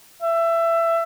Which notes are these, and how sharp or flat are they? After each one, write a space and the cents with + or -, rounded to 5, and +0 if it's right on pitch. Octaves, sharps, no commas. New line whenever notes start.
E5 +20